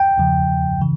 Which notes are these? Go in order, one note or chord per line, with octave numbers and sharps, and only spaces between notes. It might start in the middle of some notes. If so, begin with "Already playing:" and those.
Already playing: G5
E2 C#3 F3
C#3 E3